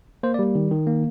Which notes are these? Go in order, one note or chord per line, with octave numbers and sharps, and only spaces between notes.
A#3 C5
D5
G3
D#3
D#3
A#3